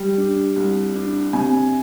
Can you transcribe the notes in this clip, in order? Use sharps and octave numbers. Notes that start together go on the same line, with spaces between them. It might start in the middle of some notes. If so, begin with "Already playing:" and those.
Already playing: G3
D4
C2
D4
C3 G#5